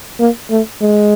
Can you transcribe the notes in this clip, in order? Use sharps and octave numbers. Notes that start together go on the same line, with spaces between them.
A#3
A3
G#3